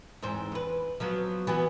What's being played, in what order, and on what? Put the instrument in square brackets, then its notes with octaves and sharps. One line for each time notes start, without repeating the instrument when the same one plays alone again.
[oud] E2 G#2 C4
E2 B4
F3 F#3 B3
E3 B3 F#4